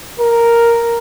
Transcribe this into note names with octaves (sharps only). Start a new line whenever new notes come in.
A#4